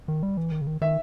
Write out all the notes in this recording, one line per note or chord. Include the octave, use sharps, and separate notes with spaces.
D#3
G3
E3
D#3
C#3
D#3
D#3 E5